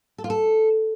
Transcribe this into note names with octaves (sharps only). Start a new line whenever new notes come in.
A4
F4
A4